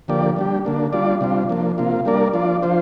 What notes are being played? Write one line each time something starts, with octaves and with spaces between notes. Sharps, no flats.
D3 F3 A#3 G4 D5
G3 D4 G4
D3 A#3 D4
G3 D4 F4 D5
C3 G3 D4 F4
F3 A#3 D4
C3 A#3 F4
G3 A#3 D4 A#4 D5
F3 D4 F4 D5
F3 D4 F4 C5